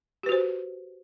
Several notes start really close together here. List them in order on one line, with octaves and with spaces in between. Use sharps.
G4 B4 F#4 C5